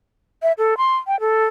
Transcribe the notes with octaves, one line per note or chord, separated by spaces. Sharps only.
E5
A4
C6
G5
A4